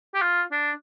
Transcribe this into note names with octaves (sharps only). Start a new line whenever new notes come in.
G4
F4
D4